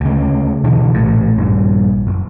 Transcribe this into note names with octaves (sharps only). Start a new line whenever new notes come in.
D2 C#3
B2 D3 E3
A#1 A2
A#1 G2
F#1